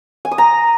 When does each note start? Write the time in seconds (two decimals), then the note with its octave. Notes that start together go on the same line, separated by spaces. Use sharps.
0.25 G#5
0.31 D#6
0.38 A#5